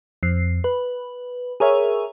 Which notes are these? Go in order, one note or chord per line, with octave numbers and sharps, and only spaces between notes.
F2 C7
B4
G#4 A#4 C#5 E5